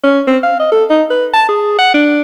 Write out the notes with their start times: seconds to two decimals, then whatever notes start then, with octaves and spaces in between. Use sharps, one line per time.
0.03 C#4
0.27 C4
0.43 F5
0.60 D#5
0.71 A4
0.90 D#4
1.10 B4
1.34 A5
1.49 G#4
1.79 F#5
1.94 D4